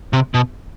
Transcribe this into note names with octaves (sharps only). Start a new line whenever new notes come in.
C3
B2